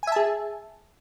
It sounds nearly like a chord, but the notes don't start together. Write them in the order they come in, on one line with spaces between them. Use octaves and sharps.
G#5 E5 A5 G#4